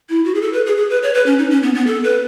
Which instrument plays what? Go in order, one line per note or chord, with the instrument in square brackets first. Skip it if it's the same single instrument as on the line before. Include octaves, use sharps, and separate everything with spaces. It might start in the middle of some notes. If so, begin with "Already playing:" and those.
[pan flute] E4
F#4
G#4
A4
B4
G#4
G#4
B4
C#5
B4
C#4
D#4
C#4
B3
B3
A4
B4